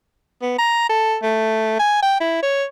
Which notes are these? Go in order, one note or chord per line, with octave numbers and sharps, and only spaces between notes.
B3
A#5
A4
A3
G#5
G5
E4
C#5